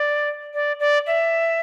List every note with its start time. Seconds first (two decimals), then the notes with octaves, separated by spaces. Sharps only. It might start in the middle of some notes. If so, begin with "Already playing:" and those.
Already playing: D5
0.54 D5
0.79 D5
1.06 E5